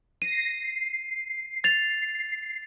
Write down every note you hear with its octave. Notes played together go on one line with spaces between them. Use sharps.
A#6 C7 D#7
C7
A6 F7